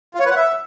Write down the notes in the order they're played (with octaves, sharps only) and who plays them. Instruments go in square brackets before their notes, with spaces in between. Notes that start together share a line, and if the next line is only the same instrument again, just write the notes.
[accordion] F4
C#5
B4
F#5
E5